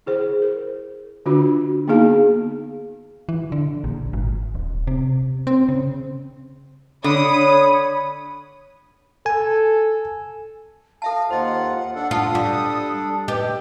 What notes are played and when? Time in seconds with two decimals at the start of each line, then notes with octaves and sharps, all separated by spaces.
0.06 E4 G#4 C5
0.42 A#4
1.26 D3 D4 F4 F#4
1.88 A#3 B3 D#4 G#4 F5 A5
3.29 E3
3.52 D3
3.84 A#1
4.13 G#1
4.55 D#1
4.87 C3
5.47 C4
5.69 C#3
7.04 D3 C#5 B5 D#6
9.26 A4 G#5
11.02 A4 E5 F5 A5
11.30 D#2 F4 C5 D#5 F#5
11.95 D4 A4 F#5
12.11 F4 F#5 A5 C#6 D#6
12.35 G3 C#6
13.28 G4 B4 D#5